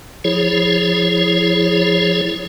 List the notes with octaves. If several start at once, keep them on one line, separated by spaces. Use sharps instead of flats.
F3 E4 G#4 C#5